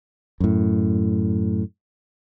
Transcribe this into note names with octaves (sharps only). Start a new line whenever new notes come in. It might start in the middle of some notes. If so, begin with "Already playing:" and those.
F#2 A2